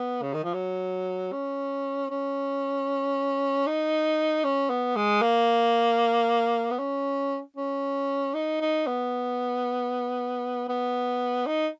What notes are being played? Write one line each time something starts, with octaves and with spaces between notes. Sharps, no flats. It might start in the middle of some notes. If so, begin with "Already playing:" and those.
Already playing: B3
C#3
D#3
F3
F#3
C#4
C#4
D#4
C#4
B3
G#3
A#3
B3
C#4
C#4
D#4
D#4
B3
B3
D#4